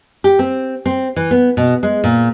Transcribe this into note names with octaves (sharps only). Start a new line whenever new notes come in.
G4
C4
C4
E3
B3
B2
G#3
A#2